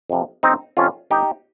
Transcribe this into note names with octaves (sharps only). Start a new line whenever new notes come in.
F2 C3 F3
G1 C4 D#4
F2 C3 F3 C#4 F4
G1 D#4 G4